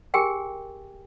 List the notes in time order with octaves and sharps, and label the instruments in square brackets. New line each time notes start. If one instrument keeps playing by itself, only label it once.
[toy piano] G4 G#4 A#4 G5 G#5